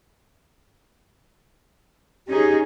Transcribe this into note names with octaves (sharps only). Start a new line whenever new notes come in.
C#4 D#4 G4 G#4